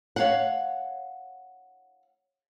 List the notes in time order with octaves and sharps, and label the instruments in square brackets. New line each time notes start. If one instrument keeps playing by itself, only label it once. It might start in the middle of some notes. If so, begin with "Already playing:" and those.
[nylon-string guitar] C#5 F5 F#5